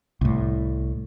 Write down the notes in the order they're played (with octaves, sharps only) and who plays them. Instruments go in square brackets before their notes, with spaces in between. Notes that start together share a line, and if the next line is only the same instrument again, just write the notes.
[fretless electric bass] C2 A2